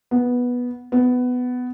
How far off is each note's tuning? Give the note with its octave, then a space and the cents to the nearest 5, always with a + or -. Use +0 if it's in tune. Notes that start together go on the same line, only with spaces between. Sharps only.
B3 -10
B3 +10